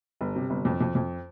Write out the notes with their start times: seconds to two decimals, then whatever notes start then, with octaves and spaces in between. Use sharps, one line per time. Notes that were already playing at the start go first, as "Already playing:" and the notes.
0.21 G1
0.36 C3
0.50 G1
0.65 F2
0.81 F2
0.95 F2